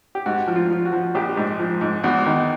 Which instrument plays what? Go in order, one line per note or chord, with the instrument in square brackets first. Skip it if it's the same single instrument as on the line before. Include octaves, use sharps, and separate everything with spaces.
[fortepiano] G4
G#2 F#4
F3
F4
F3
F#4
F3
A#1 G4
G#2
F3
G#2
E2 F#4
D#3